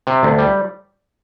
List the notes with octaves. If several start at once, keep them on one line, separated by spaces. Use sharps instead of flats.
C3
D2
G3